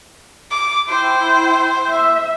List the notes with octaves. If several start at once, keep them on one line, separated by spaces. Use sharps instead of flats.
D6
E4 C5 G5
E5